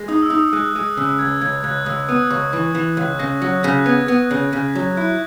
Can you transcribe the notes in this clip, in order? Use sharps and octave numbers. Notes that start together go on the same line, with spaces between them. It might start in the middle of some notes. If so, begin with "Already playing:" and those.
Already playing: G#3
D#4 D#6
E6
D#4 D#6
G#3 F#6
G#3 D#6
C#3 E6
C#2 G#6
C#2 G#6
G#6
C#2 F#6
D#6
C#2 E6
B3 D#6
C#2 C#6
E3 C#6
E3
C#2 F#6
C#3 A#6
F#3 A#6
C#3 A#6
F#6
B3 G#6
B3
C#3
C#3
F#3
E4 F#6